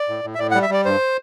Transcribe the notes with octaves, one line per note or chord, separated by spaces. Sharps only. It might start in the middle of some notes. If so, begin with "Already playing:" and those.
Already playing: D5
A2
A2
E5
A2 D5
F#5
G3
E5
G3 D5
G2 C5